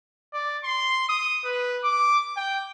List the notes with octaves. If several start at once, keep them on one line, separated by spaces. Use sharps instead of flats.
D5
C6
D#6
B4
D6
G5